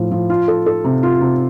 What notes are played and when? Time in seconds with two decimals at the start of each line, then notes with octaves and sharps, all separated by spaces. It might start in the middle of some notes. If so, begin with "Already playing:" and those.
Already playing: A2 F3
0.11 F3
0.30 F4
0.48 A4
0.66 A4
0.84 C3
1.03 F4
1.21 C3